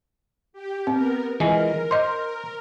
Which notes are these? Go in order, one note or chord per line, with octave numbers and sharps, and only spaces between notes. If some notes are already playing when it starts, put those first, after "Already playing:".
G4
B3 C4 A#4
E3 G#3 F4 A#4 G#5
C5 D#5 C6